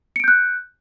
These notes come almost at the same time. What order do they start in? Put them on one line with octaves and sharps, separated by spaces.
C#7 D7 G6 F#6